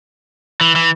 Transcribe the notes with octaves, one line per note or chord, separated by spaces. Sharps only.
E3
E3